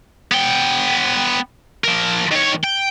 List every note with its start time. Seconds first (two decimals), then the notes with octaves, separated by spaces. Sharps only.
0.32 B3 G5
1.84 F3 A#4
2.31 D#3 C#5
2.64 G5